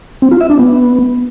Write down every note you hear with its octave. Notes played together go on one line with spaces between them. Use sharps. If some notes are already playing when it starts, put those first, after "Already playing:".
C4
F4
E5
D4
B3